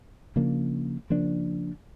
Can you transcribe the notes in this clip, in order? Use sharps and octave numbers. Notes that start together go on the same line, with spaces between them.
C#3 F3 A#3 D4
C#3 F3 A#3 D4